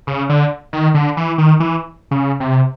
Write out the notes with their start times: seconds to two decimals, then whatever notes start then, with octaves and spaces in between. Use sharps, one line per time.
0.07 C#3
0.29 D3
0.73 D#3
0.94 D3
1.17 E3
1.38 D#3
1.60 E3
2.11 C#3
2.40 C3